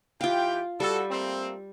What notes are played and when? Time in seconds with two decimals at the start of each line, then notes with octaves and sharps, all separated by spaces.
0.21 E3 F4 G4 F5 G5
0.80 G3 F#4 A4
1.10 A3 A#3 C4